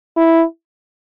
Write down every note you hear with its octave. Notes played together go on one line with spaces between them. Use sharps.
E4